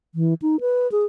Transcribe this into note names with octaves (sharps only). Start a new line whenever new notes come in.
E3
D#4
B4
G#4